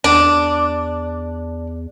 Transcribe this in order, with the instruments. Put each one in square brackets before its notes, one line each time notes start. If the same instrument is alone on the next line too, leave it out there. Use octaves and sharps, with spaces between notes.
[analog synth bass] E2 [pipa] D4